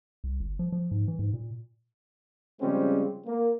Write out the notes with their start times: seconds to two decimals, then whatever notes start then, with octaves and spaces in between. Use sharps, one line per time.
0.24 C2
0.40 G1
0.59 F3
0.72 F3
0.91 G#2
1.08 E3
1.19 G#2
1.34 A#2
2.62 C#3 F3 G3 G#3 C4 C#4
3.26 A#3